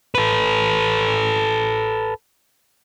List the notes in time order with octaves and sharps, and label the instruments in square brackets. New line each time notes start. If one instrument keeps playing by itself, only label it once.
[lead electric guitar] A4 B4